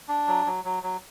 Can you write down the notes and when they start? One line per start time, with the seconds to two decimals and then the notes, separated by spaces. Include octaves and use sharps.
0.08 D4
0.28 F#3
0.46 F#3
0.65 F#3
0.83 F#3